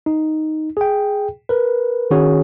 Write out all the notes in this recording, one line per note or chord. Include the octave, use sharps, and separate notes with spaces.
D#4
G#4 G5
A#4 B4
D#3 C#4 F#4 G#4 C#5